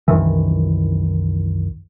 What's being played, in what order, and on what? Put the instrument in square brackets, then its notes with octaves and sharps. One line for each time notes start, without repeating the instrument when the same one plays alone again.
[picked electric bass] C2 F#2 D#3 E3